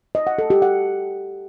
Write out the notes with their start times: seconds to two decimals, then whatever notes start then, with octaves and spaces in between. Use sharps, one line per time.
0.15 D#5
0.27 F#5
0.38 A4
0.50 G4
0.62 F#5